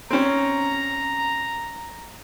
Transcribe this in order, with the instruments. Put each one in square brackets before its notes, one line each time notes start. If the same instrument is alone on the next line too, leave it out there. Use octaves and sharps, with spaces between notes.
[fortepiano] C4 C#4 [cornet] A#5